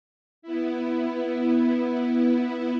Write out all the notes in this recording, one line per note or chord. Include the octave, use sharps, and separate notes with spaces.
B3 E4